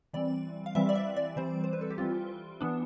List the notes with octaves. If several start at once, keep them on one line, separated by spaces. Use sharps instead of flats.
E3 G3 C4 D5
F5
E3 G3 C4 E5
D5
E5
D5
E3 G3 C4 C5
C5
B4
A4
G4
E3 G3 C4 F4
E3 B3 D4